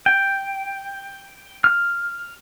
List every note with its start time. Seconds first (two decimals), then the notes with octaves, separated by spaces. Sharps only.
0.06 G5
1.64 F6